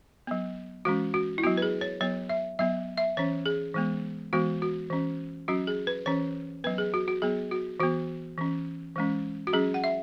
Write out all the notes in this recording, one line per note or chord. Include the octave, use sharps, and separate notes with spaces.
F#3 B3
E3 G#3 C#4 F#4
F#4
E4
F#3 B3 F#4
B4
G#4
C#5
F#3 B3 C#5
E5
F#3 B3 E5
E5
E3 C#4 C#5
G#4
E3 G#3 B3
E3 G#3 B3 F#4
F#4
E3 C#4
F#3 C#4 F#4
G#4
B4
E3 C#4 C#5
F#3 B3 B4
G#4
F#4
F#4
F#3 B3 G#4
F#4
E3 B3 F#4
E3 C#4
E3 G#3 C#4
F#4
F#3 C#4 G#4
F#5
E5